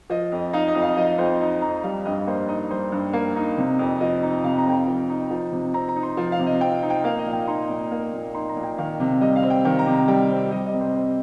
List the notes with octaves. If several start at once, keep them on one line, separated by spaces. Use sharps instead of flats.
F3 D#5
F2
D#4 F5
D#5
F2
F5
F3 D#5
F2 C5
D#4 D#5
F2 A#5
G3 F5
G2 D#5
A#3 C5
D#4 D#5
G3 C5
G2
A#3
D#4
C3
F2
F3 D#5
D#4
C3 F5
A#5
F2 G5
A#5
F3
D#4
F3
C3
C4 A#5
A#5
D#4
C6
F3
F5
C3
D#5
C4 G5
D#4
G5
A#3 F5
D#5
A#2
G5
D#4 C6
A#2
A#3
A#2
D#4 C6
A#5
A#2
G5
D#3 F5
C3
G3 D#5
F5
C4
G5
D#3 G5
A#5
C3
A#5
G3 G5
C4
G3 D#5
D#5
C3
C5
C4